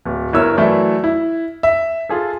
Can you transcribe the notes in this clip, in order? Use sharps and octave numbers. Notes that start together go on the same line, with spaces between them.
D1
G1 E4 A#4 C#5 E6
E3 F#3 A3 D5 E5
E4
E5
F4 G#4 A4